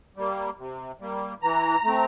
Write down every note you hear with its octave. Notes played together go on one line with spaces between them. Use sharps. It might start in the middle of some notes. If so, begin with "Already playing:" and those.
G3 A#3
C3
G3 A#3
E3 A#5
A3 C4